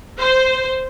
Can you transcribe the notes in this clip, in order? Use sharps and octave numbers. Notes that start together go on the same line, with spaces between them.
C5